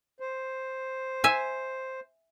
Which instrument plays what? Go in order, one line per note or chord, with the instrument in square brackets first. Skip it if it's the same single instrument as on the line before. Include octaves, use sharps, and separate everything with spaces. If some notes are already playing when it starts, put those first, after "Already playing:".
[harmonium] C5
[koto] E5 G#5